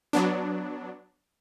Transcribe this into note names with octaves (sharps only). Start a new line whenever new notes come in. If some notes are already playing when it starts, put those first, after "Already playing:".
F#3 B3 D4